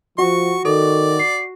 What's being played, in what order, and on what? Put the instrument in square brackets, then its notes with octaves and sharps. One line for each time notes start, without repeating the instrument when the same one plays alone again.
[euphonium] F3 [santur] F#4 [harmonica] C#6
[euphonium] D#3 [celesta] A4 [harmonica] D5
[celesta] C7